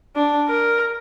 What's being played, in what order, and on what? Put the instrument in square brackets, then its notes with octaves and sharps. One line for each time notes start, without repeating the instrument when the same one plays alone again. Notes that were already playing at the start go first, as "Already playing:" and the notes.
[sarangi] D4
A#4